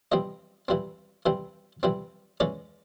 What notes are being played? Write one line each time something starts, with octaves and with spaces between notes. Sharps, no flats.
E3 G3 C4 D#5
E3 G3 C4
E3 G3 C4
E3 G3 C4
E3 G#3 C#4 D5